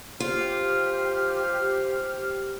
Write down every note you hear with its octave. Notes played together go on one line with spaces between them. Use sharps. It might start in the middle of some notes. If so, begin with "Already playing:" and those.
F4 G4 C5 F6